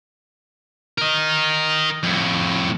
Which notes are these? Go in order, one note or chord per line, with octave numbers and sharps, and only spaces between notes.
A#4 D#5
F2 A2